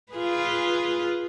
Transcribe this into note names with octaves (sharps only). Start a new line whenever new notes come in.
F4 G#4 B4